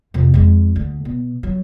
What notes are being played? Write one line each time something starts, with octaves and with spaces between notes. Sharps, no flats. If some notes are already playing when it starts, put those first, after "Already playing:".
F2 C3
F2 G#3
D2
B2
F#3